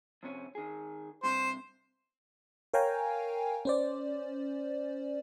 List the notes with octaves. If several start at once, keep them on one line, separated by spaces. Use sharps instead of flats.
F2 C3 C#4
D#3 G#4
G2 C3 C5
A#4 C#5 F5 G5 G#5 A#5
C#4 C5 D5